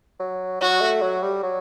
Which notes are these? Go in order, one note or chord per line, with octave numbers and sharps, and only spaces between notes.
F#3
F#3 F#4
A3
F#3
G3
F#3